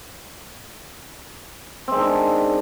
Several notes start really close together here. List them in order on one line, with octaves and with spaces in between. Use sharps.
C4 G#3 D#3 D4